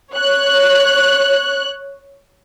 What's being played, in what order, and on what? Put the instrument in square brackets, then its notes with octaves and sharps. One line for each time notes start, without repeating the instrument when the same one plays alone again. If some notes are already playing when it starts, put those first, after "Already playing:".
[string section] C#5 F#6